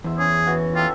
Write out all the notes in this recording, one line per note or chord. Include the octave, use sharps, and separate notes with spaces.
E2 E4 C5
C#4 G#4
E3 F#4
F4 G4 A4 E5